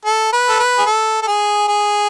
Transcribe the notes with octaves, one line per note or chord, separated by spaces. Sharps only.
A4
B4
A4
B4
G#4
A4
A4
G#4
G#4